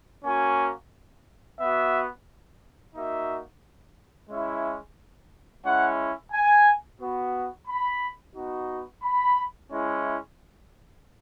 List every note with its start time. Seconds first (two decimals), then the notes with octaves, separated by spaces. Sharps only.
0.24 A#3 C#4 F#4 G#5
1.59 B3 F#4 E5
2.95 A#3 D#4 F#4 E5
4.29 G#3 C#4 E4 E5
5.64 G#3 C#4 E4 F#5
6.32 G#5
6.99 B3 F#4
7.67 B5
8.35 B3 D#4 F#4
9.03 B5
9.70 G#3 C#4 E4